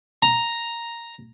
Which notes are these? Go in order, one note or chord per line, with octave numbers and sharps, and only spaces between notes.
A#5